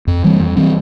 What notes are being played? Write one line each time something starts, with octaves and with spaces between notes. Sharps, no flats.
F2
E3 G3 C4
F2
E3 G3 C4